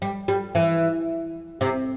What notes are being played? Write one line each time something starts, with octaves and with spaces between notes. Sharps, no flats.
G3
G3
E3
C3